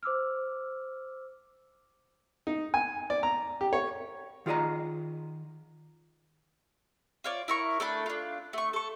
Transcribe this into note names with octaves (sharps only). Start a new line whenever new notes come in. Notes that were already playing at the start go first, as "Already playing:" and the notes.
C5 D6 E6 F6
D#4
G#5
D5
A#5
G4
C#5
D#3 F4 G#4 D5 D#5 A#5
F4 C#5 D5
E4 A#4 C#6
A3 D4 B5
D4 F4
A3 C#6
A4 C#6